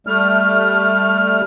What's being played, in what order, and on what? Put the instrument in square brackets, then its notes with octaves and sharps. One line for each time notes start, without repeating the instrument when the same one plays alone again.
[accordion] G3 A3 F6